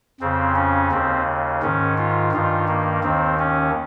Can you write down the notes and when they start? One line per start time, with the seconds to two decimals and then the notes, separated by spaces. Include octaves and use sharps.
0.20 F2 C#3 C4
0.56 C#4
0.91 D#2 C#3 C4
1.62 G#2 D#3 C#4
1.98 F4
2.32 G2 D#3 F4
2.68 A#3
3.03 D#2 D#3 C4
3.39 C#4